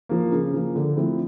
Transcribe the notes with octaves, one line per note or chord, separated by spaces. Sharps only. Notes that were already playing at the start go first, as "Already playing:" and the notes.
F3 A#3
C#3
F3 A#3
D3
F3 A3 C4 E4